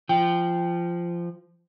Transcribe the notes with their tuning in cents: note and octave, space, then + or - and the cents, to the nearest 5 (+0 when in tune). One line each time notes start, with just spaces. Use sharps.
F3 -15 G5 +0